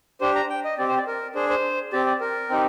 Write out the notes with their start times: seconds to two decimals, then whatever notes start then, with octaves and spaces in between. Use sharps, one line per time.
0.21 D4 G4 C5
0.35 A#5
0.50 G5
0.64 D#5
0.78 C4 G4 D5
0.88 C5
0.98 D5
1.07 A#4
1.35 D4 G#4 C5
1.49 C5
1.93 C4 G4 D5
2.06 D5
2.21 A#4
2.50 C4 D#4 G4